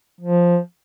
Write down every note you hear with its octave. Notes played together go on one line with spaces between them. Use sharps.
F3